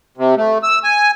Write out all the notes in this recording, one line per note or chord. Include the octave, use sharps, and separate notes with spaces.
C3
A3
E6
G#5